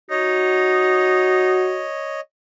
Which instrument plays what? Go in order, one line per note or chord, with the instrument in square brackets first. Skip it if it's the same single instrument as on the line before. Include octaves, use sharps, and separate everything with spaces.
[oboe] D#4 [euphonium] F#4 [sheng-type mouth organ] C#5 D#5